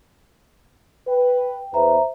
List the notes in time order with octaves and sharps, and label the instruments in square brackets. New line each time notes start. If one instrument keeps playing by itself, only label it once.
[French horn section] B4 [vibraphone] G5
[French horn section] E2 B4 [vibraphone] C5 E5 A#5